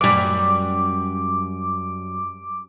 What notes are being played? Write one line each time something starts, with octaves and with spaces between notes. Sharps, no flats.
F#2 G3 D6